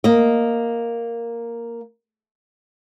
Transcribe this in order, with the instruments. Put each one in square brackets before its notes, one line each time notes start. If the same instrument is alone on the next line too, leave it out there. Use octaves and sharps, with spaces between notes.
[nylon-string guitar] A#3 D#5